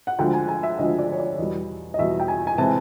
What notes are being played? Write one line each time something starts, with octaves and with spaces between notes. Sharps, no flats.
F#5
D2 D3 F3 G#3 G5
G#5
G#5
E5
D2 D3 F3 G#3 D#5
D5
C#5
D5
E2 B2 G3 D#5
D#5
E2 B2 G3 E5
G5
G#5
G#5
C3 E3 G#3 A5